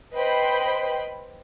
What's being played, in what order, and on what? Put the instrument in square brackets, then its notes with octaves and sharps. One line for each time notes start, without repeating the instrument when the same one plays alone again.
[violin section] B4 C5 D#5 G5 B5